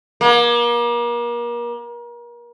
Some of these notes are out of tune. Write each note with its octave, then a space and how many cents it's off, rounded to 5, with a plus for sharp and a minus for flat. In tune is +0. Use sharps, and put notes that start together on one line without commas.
A#3 +35